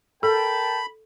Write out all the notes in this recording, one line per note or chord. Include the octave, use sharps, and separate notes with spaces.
A4 A#4 G5 A5 B5